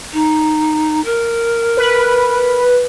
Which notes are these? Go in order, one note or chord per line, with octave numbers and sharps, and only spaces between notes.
D#4
A#4
B4